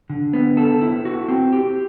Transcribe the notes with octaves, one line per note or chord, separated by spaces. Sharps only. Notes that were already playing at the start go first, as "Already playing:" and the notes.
D3
B3
A4
E4
F#4
C4
G4